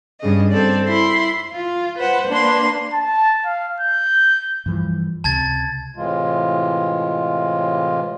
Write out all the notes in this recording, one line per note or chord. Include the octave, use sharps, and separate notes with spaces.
G2 C#3 D#5
G2 C4 A4 D5
E4 B5 C6
F4
B4 C5 F#5
A#3 D4 B4 C6
A5
F5
G6
G2 E3 F3
C#2 C3 A5 G#6 A6
A2 C3 E3 G#3 F4